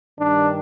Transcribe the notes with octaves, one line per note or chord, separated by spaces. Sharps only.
G2 D#3 G3 D4